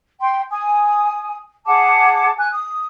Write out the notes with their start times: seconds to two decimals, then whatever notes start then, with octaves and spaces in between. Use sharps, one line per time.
0.20 G5 C6
0.50 G#5 D#6
1.66 G#4 F#5 A5 D6
2.37 G#5 F#6
2.51 D#6